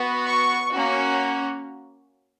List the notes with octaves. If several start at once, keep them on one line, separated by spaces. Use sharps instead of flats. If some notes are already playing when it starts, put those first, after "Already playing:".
Already playing: B3 F#4
C#6
A#3 C#4 F#4